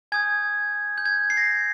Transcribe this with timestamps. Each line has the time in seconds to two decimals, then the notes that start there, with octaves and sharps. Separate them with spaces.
0.12 G#5 D#6 G6 G#6
0.98 G6
1.06 G#6
1.30 C7
1.37 A#6